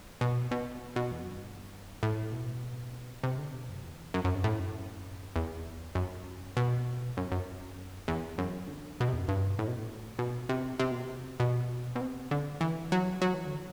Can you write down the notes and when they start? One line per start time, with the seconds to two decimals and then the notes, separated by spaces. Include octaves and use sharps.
0.21 B2
0.51 B2
0.96 B2
1.11 E2
1.21 F#2
1.32 G2
2.03 A2
2.32 B2
3.24 C3
3.38 D3
3.53 B2
3.69 F#2
3.84 E2
4.14 F#2
4.25 F#2
4.34 G2
4.44 A2
4.59 F#2
5.36 E2
5.95 F#2
6.57 B2
7.17 F#2
7.32 F#2
8.08 E2
8.38 F#2
8.68 D3
9.00 B2
9.08 C3
9.13 E2
9.18 F#2
9.28 G2
9.59 A2
9.68 B2
9.78 A2
10.19 B2
10.49 C3
10.80 C3
10.91 B2
11.04 C3
11.40 B2
11.96 B2
12.01 C3
12.31 D3
12.61 E3
12.92 F#3
13.22 F#3
13.34 E3
13.46 D3